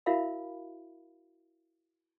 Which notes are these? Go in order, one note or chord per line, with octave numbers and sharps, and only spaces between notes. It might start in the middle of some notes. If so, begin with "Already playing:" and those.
E4 F#4 A#4 E5 F5 B5